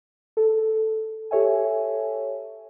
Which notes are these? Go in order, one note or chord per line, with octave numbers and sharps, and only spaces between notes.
A4
G4 A4 C#5 E5 G#5